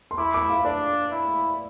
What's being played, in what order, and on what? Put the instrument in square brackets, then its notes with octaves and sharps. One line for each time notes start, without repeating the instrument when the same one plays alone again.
[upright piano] C6
[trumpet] E4 [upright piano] D6
[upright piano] D6
F5
[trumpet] D4 [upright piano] D5
[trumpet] E4